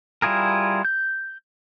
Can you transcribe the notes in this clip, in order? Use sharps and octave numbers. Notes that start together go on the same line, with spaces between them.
G3 E4 F4 G#4 A#4
G6